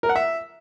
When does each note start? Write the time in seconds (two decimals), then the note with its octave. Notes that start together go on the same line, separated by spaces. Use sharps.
0.03 A#4
0.09 F#5
0.16 E5